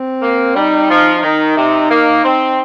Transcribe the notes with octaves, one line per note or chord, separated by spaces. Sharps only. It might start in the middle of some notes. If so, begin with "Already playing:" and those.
Already playing: C4
A#3
G3 D#4
F3
D#3 D#4
C3
A#3
C4